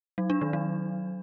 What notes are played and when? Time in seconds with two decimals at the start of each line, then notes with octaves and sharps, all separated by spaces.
0.18 F#3
0.30 D4
0.41 D#3
0.53 F#3